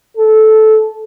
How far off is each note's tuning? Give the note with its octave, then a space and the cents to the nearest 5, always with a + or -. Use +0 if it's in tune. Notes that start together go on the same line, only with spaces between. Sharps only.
A4 -15